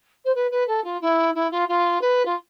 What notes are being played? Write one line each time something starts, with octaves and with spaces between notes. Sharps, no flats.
C5
B4
B4
A4
F4
E4
E4
F4
F4
B4
F4